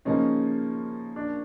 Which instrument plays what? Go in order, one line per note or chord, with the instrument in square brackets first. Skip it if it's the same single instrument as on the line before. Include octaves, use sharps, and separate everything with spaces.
[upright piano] C#3 F3 A#3 C#4 [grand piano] D#4
[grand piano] D4